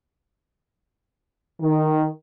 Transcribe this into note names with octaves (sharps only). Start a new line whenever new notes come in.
D#3